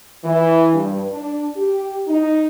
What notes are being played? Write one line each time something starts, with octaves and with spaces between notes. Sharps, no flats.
E3
G2
D4
G4
D#4